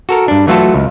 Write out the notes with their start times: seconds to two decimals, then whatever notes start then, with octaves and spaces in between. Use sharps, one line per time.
0.09 F#4 A4 A#4
0.28 G2 D4
0.47 E3 F#3 A3 F4 F#4 A4
0.74 C#2